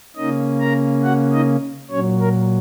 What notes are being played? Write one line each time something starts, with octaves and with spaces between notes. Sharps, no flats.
C#3 A#3 C#4 D#4 D#5
A#4 A#5
F#4 F#5
D#4 D#5
A#2 F#3 C#4 C#5
A#4